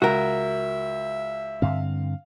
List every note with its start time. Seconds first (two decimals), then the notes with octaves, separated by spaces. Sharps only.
0.02 C#2 F#4 A#4 E5
1.62 G2 D3 C4 F5